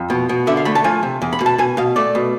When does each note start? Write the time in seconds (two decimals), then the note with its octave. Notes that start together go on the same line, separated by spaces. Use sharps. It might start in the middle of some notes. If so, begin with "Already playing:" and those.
Already playing: F2
0.10 B2
0.29 B2
0.47 D3 E5
0.57 F5
0.65 A3 B5
0.75 A5
0.84 F3 G#5
1.03 C3
1.22 E2
1.33 B5
1.41 B2
1.46 A5
1.58 B2 G#5
1.77 B2 F5
1.96 A3 D5
2.15 B2